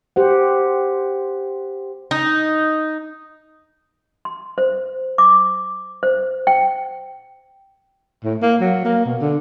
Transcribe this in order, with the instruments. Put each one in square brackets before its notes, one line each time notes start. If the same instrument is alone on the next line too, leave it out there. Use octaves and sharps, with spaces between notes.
[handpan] G4 C5 F#5
[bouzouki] D#4
[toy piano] C6
C5
D6
C5
G5
[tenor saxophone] A2
A#3
F#3
A#3
B2
D3